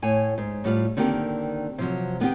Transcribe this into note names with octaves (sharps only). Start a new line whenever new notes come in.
A2 C#5 G#5
G#2
A2 G3 F4
D3 D#3 A#3 C4 G4
C3 F3 F#3
D#3 B3 C4 F#4 G4